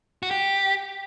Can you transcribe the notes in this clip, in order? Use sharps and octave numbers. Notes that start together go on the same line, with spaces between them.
F#4
G4